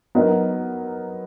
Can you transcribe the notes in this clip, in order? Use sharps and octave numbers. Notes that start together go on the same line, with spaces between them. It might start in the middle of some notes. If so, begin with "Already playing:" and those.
F#3 B3 D#4 A#4